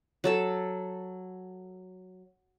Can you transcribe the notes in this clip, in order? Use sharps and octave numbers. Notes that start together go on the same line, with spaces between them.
F#3 A4 A5